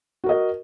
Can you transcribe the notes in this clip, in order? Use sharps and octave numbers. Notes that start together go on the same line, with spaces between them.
F#4 A#4 D#5